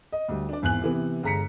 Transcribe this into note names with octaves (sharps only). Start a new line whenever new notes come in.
D#5
D2 G3
D4 D5
G#1 E2 G#5 F#6 F#7
C3 E3 B3
G1 G#3 A#5 B6 C#7